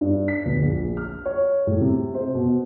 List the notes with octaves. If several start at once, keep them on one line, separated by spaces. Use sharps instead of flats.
G2
B6
D1
A#1
F6
C#5
A2
C3
C5
B2